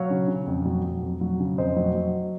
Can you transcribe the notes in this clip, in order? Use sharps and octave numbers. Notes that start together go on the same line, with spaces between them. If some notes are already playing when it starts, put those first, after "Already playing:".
Already playing: F#3 C#5 F5
C#3
C#3
F2
F#3
F#3
F2
F#3
C#3
F2 C5 D#5
F#3
F#3